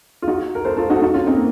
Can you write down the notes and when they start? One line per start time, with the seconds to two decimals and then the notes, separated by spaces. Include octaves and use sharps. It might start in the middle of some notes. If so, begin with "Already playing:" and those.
0.22 F4
0.27 D#4 F#4
0.55 A#4
0.65 A4 C5
0.77 F4 A4
0.90 D#4 F#4
0.96 A4
1.02 D#4 F#4
1.14 C#4 F4
1.27 C4 D#4
1.35 A#3